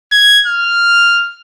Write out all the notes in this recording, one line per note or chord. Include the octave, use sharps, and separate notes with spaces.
G#6
F6